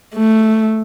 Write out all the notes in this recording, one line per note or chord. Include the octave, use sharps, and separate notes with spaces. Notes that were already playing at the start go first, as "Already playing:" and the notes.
A3